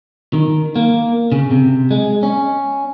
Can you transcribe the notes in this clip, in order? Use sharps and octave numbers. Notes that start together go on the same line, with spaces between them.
D#3
A#3
C#3
C3
G#3
C#4